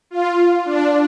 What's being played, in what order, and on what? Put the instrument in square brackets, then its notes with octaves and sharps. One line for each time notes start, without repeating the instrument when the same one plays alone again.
[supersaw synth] F4
D4